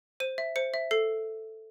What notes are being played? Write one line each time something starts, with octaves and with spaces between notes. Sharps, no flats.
C5 D#7
E5
C5 C#7
E5
A4 C7